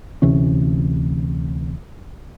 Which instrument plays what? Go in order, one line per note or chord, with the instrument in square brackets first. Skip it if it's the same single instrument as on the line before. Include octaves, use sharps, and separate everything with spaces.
[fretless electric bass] D2 C3 E3 C#4